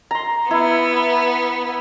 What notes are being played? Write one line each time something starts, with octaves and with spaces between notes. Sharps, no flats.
A#5 C6
B3 E4